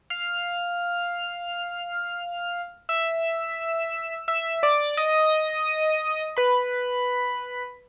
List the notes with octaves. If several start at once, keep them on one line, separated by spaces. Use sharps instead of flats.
F5 F6
E5 E6
E5 E6
D5 D6
D#5 D#6
B4 B5